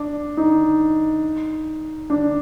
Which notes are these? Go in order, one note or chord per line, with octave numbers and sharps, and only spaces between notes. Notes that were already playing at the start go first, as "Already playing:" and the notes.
Already playing: D4
D#4
D4